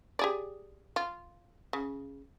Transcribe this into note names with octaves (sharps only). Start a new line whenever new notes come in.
G4 G#4 D5
F4
C#3